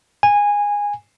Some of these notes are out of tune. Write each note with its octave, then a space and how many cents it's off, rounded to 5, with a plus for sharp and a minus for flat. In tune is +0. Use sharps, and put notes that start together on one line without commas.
G#5 -15